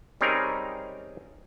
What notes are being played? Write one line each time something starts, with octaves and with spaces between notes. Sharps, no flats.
G3 C4 C#4 D#4 G#4 A#4